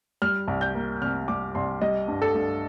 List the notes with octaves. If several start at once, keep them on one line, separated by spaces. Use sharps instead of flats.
G3 F6
C2
G6
A#3
C3 F6
G3 D6
C2 C6
G3 D#5
G2
A4
G2